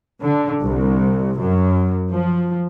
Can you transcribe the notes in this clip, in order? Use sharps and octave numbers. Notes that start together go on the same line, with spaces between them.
D3
C2
F#2
F3